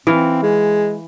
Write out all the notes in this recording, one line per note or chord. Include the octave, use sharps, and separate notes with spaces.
E3 C4 F5
G#3